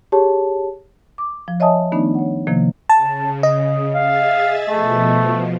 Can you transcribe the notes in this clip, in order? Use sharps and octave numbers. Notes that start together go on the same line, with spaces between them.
G4 G#4 C#5 A5
D6
F3
C#5 D#5 E5 G#5 A5 D#6
D#3 A3 B3 D4 D#4 D5
C#5 F#5
C3 D#3 F3 A#3
C#3 A5
D#5
G#4 E5 F5 A6
B2 F3 A3